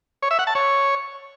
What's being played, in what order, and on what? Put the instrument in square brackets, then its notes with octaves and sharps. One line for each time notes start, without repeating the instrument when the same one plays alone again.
[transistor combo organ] C#5
E5
F#5
A5
C#5